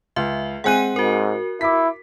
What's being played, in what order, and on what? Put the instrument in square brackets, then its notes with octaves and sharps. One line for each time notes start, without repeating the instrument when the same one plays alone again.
[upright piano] C#2 [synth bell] E5
[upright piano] G#3 C4 F#6 [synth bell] F#5 G#5 D#7
[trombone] G#2 [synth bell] F#4 A#4
[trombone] E4 [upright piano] D6 B6